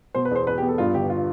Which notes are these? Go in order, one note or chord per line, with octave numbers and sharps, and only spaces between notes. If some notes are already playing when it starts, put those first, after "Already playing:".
B2 C5
B4
E2 C5
E2 B4
G4
B3
A4
G2 F4
G1 G4
F4